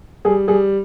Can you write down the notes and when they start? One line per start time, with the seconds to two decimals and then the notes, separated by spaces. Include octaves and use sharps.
0.25 G3 G#4
0.48 G3 G#4